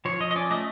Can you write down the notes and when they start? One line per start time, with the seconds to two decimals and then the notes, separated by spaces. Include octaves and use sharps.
0.05 F3 C#5
0.20 F3 D#5
0.31 D#5
0.36 C#4 D5
0.50 A3 D#5